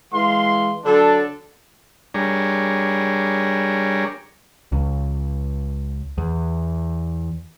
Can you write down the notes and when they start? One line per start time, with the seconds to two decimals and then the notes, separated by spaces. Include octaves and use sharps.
0.12 E3 G#3 F5 C6
0.84 D3 F#3 D4 A4
2.14 G3 D4 G#4 A#4 C#5
4.72 C#2
6.18 E2